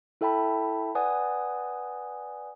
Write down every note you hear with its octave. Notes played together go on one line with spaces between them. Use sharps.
E4 A4 E5 G5 A5 B5
B4 D5 F#5 G#5 D#6